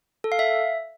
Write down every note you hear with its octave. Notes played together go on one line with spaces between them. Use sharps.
A4
F5
E5